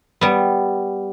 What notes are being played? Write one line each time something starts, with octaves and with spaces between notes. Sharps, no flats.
G3 B3